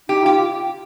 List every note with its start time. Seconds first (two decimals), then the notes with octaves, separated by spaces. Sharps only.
0.09 D#4 G4
0.23 F4 G4